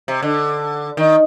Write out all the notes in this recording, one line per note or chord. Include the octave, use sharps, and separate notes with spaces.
C3
D3
D#3